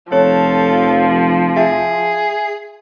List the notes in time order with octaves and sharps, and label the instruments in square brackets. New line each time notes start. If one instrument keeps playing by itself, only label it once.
[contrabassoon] F1 [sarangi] F3 [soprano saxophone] A4 [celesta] C#5
[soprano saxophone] G#4 [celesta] E5